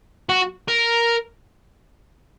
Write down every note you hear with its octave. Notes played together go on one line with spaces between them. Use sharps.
F#4
A#4